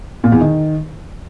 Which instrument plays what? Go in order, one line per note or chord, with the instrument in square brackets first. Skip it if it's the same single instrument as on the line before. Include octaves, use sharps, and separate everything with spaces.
[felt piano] A#2
E2
D#3